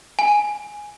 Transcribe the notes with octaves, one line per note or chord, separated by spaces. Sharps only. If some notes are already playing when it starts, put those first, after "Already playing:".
G#5